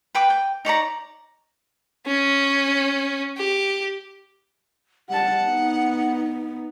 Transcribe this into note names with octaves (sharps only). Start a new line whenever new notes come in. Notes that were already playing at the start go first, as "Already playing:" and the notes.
B4 G5 D6
G5
D#4 C#5 D5 A#5
C#4
G4
G3 F#5 A5
B3 D#4